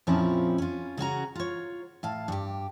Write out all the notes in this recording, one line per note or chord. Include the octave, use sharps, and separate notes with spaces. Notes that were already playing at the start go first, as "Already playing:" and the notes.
F2 A#2 F3 C4 C#4 E4
C#4 F4
C#3 C#4 F#4 A#5
F4 C#5
A2 F5 A5
G2 G4